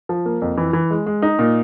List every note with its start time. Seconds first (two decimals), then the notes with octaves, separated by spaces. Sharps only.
0.09 F3
0.26 A#3
0.42 F2
0.57 E3
0.73 E3
0.91 G#3
1.06 G#3
1.22 D#4
1.39 A#2